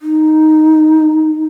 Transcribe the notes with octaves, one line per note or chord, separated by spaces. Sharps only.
D#4